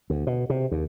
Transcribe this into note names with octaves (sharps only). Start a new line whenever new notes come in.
D2
B2
C3
D#2